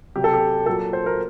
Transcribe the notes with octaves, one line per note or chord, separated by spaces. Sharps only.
C3 F#3 G4
A4
G4
A#2 F#3 A4
C5
A#4